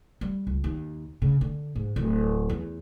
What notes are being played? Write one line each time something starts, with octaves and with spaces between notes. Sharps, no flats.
G3
C#2
D#2
C#3
D3
G#2
D1
E2